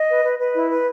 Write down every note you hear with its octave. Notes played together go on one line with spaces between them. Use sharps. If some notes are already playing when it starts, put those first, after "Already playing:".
Already playing: D#5
B4
B4
B4
E4
B4